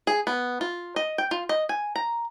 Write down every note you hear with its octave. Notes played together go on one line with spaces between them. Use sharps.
G#4
B3
F4
D#5
G5
F4
D#5
G#5
A#5